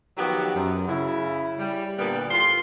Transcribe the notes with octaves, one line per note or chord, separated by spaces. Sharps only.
D#3 F3 F#3 B3 F#4 G4
F#2
C#3 E4
G3
A#2 D3 G3 A#3 B3
A2 F4 C6